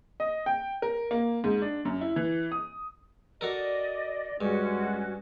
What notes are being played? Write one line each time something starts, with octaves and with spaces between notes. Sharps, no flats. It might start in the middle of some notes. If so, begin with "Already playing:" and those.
D#5
G5
A#4
A#3
G#2
D4
F#2
E4
E3
D#6
F#4 A4 A#4 D5 D#5
G2 G#3 C#4 F#4